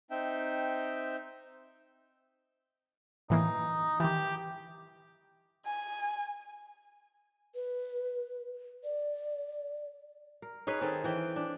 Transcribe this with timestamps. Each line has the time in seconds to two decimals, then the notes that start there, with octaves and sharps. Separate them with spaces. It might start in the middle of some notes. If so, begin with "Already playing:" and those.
0.11 C4 D#4 E5 G5
3.30 A2 E3 A#3 D#4
4.00 D#3 E3 G4
5.65 G#5
7.55 B4
8.84 D5
10.42 A#4
10.67 C#4 D#4 G#4 B4
10.81 D#3 C4 G#4 A4
11.04 E3 G5
11.36 D4